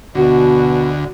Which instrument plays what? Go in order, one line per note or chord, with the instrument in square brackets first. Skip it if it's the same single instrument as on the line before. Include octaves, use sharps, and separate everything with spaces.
[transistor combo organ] D2 [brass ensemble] B2 [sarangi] F#4